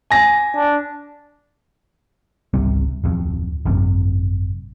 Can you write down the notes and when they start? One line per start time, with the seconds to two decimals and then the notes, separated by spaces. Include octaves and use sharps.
0.10 G#5 A#6
0.56 D4
2.54 G#1 C#2 C3 G3
3.04 D1 F2
3.65 G#1 F#2 C3